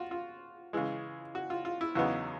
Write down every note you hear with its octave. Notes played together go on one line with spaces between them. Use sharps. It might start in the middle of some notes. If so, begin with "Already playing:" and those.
Already playing: F4 F#4
F4
C#3 E3 G#3
F#4
F4
F4
E4
E2 C#3 F#3 B3 D#4 E4